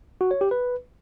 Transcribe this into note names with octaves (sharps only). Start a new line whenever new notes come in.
F#4
C#5
G4
B4